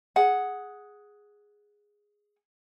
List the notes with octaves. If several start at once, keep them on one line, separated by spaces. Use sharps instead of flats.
G#4 F#5